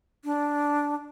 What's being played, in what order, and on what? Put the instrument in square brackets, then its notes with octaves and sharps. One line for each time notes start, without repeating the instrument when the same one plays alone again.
[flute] D4